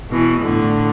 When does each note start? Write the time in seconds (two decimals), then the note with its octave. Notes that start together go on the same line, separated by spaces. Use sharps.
0.10 B2 E3
0.42 A2 D3